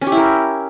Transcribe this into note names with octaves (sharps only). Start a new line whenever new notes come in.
C#4
G4
E4
A#4